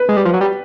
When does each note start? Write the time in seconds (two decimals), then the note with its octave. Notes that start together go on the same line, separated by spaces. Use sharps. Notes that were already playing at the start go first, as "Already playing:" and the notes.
Already playing: B4
0.09 G#3
0.17 G3
0.25 F3
0.33 F#3
0.41 G3